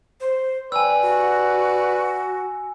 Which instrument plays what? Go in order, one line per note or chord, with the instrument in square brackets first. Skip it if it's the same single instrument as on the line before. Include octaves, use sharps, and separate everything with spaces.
[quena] C5
[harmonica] B4 D5 [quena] G5 [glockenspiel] G#5 E6
[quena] F#4